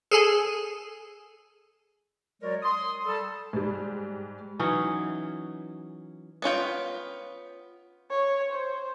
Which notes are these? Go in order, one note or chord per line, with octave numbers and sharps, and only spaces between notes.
G#4 A4 G#5
F#3 G#3 F#4 A#4 C#5 D5
C6 D#6
G3 A4 A5
G#2 G3
E3 F#3 C#4 D#4
B3 C#4 F4 G5
C#5
C5